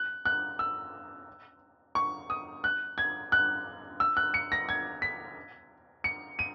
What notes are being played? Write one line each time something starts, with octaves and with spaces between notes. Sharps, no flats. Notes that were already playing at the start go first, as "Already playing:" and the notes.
Already playing: F#6
F#6
E6
C#6
D#6
F#6
G#6
F#6
E6
F#6
C#7
A#6
G#6
B6
C#7
D#7